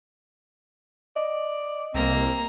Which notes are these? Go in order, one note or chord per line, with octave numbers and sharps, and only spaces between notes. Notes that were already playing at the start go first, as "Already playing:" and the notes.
D5 D#5
C2 A#3 C4 A#5